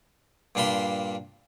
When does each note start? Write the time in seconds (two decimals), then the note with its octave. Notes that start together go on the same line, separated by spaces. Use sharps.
0.55 G2 A#2 D4 F5 B5 C6